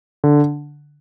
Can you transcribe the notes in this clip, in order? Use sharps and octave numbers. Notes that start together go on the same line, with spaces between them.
D3